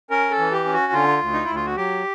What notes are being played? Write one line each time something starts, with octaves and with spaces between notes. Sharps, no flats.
C#4 A#4
A4
E3
G4
C#4
F#4
D3 F4
D2
D#4
D2 E4
F4
F#4
F#3 G4